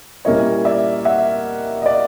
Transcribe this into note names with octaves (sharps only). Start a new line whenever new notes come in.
A#2 G3 A#3 C#4 E4 C#5 D#5
D5 E5
E5 F#5
D#5
D5